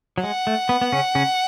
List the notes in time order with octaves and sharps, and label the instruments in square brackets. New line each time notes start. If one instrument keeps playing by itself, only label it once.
[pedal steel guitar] F#3
[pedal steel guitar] G#3 [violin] F#5
[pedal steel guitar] A3
B3
B3
C#3 C#4
C#3 C#4